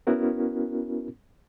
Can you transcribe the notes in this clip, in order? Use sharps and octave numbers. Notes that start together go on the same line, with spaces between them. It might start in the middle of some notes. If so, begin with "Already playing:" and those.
B3 C#4 E4 F#4 A#4